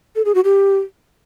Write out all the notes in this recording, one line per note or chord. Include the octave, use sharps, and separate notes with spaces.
A4
G#4
F#4
G4